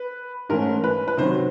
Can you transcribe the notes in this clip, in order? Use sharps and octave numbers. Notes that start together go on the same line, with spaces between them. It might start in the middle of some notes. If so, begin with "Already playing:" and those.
Already playing: B4
G#2 E3 A3 C#4 A#4
B4
B4
C3 D#3 F#3 C5